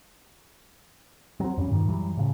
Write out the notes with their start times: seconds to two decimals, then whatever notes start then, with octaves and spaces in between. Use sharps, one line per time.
1.40 F#3 C4
1.57 F2 G3 C#4
1.69 G2 A#2 D#3
1.88 F#2 E3 F#3 G3
2.17 A2 C#3